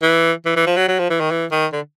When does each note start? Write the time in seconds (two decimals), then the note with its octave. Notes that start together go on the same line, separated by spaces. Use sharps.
0.02 E3
0.46 E3
0.56 E3
0.67 F3
0.77 F#3
0.88 F#3
0.99 F3
1.10 E3
1.20 D#3
1.31 E3
1.51 D#3
1.73 D3